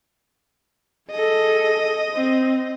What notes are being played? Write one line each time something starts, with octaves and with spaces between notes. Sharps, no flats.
G#4 A4 D#5
C4